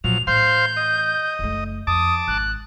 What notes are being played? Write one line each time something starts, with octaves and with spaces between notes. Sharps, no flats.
A#2 F3 F#3 F7
A2 E3 C5 F5 C6 G6
D#5
F#1 A3
F2 A5 D6 D#6
G#1 F#6